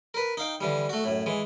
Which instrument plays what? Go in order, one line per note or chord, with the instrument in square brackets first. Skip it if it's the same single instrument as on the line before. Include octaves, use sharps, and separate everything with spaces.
[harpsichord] A#4 B4
D#4 F5 G5
D3 E3 G3
A3 F#4
F#2 A2
E3 G#3